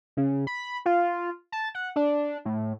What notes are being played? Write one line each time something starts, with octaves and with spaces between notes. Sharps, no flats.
C#3
B5
F4
A5
F#5
D4
A2